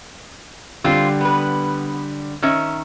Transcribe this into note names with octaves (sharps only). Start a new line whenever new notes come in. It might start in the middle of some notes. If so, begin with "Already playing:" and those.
D3 G3 C4 F4 D7
B3 B4
D#3 C#4 E5